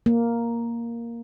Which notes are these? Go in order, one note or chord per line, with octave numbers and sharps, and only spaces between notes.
A#3